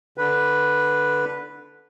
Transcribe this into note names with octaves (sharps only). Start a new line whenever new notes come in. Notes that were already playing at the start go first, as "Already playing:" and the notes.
D3 B4